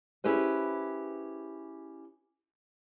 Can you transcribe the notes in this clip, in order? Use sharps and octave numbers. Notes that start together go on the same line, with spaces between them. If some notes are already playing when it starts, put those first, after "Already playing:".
C#4 E4 G4 G#4 B4 C5